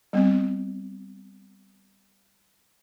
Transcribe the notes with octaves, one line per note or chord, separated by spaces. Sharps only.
G3 B3 C4